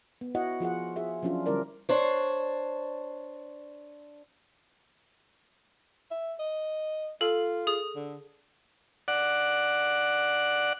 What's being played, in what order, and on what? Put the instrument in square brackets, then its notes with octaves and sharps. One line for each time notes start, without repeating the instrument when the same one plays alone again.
[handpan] B3
E4 F#4 C#5 D#5 F#5
F3 F4 G#4 F#5
F4 G#4 E5
F3 F#3 C#4 D4 F4
D3 G3 C#4 E4 A#4 D5
[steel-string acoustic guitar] D4 C5 C#5
[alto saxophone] E5
D#5
[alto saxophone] F4 [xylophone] A4
[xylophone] G#4 D#6
[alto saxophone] D3
[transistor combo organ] D5 F#5